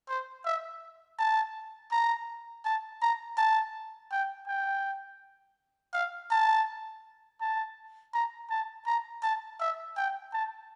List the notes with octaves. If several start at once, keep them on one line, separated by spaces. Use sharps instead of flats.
C5
E5
A5
A#5
A5
A#5
A5
G5
G5
F5
A5
A5
A#5
A5
A#5
A5
E5
G5
A5